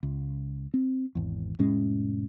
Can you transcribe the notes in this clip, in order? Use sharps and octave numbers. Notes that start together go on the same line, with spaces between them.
C#2
C4
G#1 E2
F1 A2 G#3 C#4